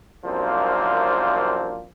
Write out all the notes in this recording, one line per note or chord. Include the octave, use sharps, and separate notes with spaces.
C2 F#2 F3 A#3 C4 D4